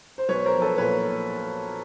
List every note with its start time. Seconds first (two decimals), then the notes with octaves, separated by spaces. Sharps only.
0.18 C5
0.29 B1 B4 C#5
0.45 A#4 C5
0.54 F3
0.61 A4 B4
0.78 A#2 B4 C#5